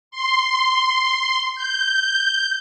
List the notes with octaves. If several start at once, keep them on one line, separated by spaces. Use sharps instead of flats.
C6
G6